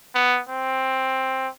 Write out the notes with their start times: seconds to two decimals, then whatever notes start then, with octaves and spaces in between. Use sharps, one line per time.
0.15 B3
0.49 C4